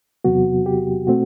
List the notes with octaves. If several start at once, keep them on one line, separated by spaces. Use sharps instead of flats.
E2 C3 F#3 B3 F#4
G4
B2 A3 C4 F#4